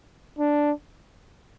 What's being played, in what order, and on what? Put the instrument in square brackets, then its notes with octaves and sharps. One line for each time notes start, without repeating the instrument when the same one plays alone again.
[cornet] D4